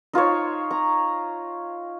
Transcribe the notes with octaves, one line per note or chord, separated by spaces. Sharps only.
D#4 F4 C5 C#5
A#5